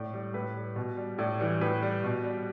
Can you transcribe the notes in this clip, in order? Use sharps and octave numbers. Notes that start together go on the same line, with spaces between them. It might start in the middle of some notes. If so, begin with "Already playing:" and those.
Already playing: A2 D5
G3
A2 B4
G3
B2
G3
A2 D5
E3 G3
A2 B4
G3
B2
G3